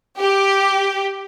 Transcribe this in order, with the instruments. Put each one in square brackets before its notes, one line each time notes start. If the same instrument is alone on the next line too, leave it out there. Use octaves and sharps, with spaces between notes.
[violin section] G4